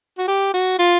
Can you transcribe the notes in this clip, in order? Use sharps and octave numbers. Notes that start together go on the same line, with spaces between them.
F#4
G4
F#4
F4